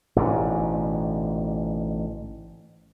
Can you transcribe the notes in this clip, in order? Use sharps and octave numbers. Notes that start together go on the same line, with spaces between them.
A1 G#2 B2 D3